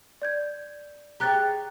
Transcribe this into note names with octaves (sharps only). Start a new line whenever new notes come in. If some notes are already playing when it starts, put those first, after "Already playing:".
D5 G6 G#6
G4 G#4 C#5 A#5 F#6 A6